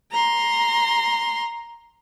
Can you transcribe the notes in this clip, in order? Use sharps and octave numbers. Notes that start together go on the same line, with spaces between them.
A#5 C6